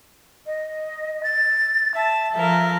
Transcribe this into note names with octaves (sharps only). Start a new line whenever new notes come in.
D#5
A6
E5 A5
F3 A4 A#4 E5